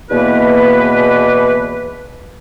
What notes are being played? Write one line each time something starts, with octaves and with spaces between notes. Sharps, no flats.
E2 B2 A#3 B4